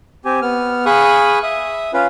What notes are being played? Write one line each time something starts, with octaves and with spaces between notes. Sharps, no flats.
C4 G4 G#5
B3 F6
G#4 F5 B5 C#6 D#6 F#6
E5 D#6
C#4 F4 B4 F5